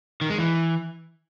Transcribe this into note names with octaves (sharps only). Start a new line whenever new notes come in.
D#3
G#3
E3